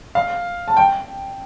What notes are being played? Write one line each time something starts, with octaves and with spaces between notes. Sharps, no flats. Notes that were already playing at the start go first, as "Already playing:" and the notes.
F5
A5
G5